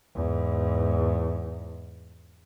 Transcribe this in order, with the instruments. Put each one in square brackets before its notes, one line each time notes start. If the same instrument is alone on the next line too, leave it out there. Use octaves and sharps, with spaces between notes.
[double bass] E2 G#2